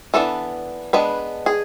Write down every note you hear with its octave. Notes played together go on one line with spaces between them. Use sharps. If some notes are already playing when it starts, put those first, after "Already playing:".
E3 B3 D4 A4
G#3 B3 D4 B4
G#4